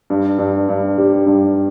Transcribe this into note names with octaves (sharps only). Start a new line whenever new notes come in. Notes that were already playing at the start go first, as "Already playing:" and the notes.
G2
G2
G2
G3
G2